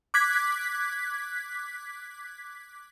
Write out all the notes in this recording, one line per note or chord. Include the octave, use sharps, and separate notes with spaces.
D6 F#6 G#6 B6